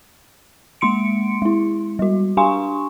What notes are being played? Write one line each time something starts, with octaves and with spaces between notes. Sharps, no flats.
G#3 A#3 C6 C#7 D7
G#3 E4
G3 F#4
D4 G4 F5 G#5 C6 C#6